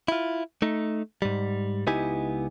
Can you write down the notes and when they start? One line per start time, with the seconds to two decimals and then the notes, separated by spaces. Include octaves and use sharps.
0.08 E4 F4
0.62 A3 D#4
1.22 G#2 G3
1.87 C#2 B3 D#4 E4 G4 G#5